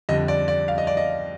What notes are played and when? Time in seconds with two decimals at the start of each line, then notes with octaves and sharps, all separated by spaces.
0.09 F2 D3 G3 D#5
0.28 D5
0.48 D5
0.68 F5
0.78 D#5
0.87 D5
0.97 D#5